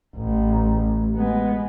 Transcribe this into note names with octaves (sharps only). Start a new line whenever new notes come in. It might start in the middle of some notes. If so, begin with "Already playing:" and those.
A1
G#3 B3